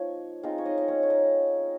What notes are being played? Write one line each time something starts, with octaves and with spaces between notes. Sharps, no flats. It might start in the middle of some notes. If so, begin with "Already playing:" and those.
Already playing: F3 A#3 D#4 C#5 D#5
G#3 C4 D#4 F4 F5
C#5
D#4 D#5
D#5
C#4 C#5
C#5
D#4 D#5